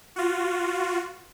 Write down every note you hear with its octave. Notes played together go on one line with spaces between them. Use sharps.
F4 F#4